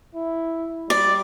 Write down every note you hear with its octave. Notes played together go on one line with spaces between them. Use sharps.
E4
G3 D5